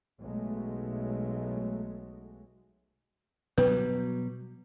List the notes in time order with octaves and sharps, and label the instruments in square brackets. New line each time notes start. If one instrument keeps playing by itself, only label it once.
[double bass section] B1 F#3 G#3 A3
[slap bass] B2 F#3 G3 [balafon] B4